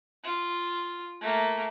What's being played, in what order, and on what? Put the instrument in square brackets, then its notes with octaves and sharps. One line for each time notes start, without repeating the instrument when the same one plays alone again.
[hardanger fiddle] F4
A3 A#3